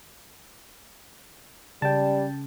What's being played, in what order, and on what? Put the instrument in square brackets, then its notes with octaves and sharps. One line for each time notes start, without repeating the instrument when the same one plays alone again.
[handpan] C#3 [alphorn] G3 [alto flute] D5 [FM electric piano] G5 A5